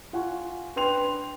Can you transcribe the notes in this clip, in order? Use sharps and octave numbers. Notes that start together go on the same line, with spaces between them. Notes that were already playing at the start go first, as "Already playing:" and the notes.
F4 F#5 G#5 C#6
D4 B4 G5 C6 F7